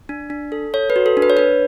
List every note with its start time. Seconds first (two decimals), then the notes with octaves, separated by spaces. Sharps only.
0.09 D4
0.30 D4
0.52 A4
0.74 A4 C#5
0.90 B4
0.96 F#4
1.06 A4
1.17 D4
1.22 B4
1.30 C#5
1.37 D4 B4